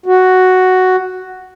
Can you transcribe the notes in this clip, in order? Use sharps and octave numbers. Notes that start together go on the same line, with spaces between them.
F#4